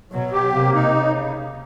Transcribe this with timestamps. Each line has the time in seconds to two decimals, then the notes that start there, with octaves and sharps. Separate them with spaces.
0.11 B2 F#3
0.33 G4
0.53 C3 A#3
0.74 D#4
0.95 C#3